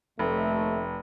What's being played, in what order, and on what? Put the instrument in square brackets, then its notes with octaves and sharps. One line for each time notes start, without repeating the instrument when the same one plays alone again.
[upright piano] F1 [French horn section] D#2 A3